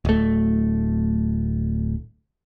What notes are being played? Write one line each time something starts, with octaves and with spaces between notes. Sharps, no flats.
D1 A3